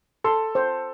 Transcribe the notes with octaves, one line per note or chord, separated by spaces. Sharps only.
A4 C6
C5